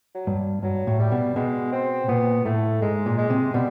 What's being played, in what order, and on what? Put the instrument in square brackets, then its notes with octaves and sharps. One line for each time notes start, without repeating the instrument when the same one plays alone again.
[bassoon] F#3
[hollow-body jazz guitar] G2
[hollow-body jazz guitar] G2 [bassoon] F#3
[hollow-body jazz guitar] A2
[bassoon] G3
[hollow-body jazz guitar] B2
[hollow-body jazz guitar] B2 [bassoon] G#3
[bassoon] C4
[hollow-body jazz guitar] A#2 [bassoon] B3
[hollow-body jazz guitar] A2 [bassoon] A3
[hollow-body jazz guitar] G#2 [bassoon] G#3
[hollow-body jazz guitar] A#2
[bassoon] G#3
[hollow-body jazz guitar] C3
[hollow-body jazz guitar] B2 [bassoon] G3